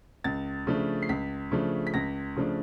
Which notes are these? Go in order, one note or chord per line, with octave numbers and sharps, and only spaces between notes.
C#2 A6
C#3 F3 A3 D4
C7
C#2 B6
C#3 F3 A3 D4
B6
C#2 A#6
C#3 F3 A3 D4